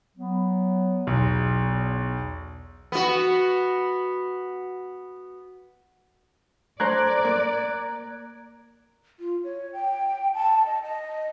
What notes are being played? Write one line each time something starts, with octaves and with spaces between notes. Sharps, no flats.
F#3 B3
B1 E2
B3 F#4
A3 C5 D5 A#5 F#6 G#6
A#3
F4
C#5
G5
A5
D#5
D#5